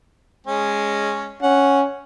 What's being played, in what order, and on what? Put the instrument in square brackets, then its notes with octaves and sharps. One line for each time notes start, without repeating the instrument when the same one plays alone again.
[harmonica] G#3 C#4
[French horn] C#4 [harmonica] F#5